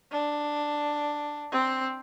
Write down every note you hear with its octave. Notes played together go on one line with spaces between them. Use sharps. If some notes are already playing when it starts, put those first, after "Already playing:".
D4
C4